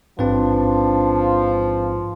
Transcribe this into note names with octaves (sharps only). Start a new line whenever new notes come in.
A1 G#2 F3 C4 D4 B4